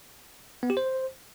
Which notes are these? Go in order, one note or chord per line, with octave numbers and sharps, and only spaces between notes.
B3
G4
C5